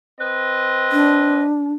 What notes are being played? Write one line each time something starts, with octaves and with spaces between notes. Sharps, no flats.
C4 B4 D#5
D4